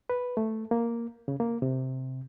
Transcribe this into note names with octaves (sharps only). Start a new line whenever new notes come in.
B4
A3
A#3
C#3
A#3
C3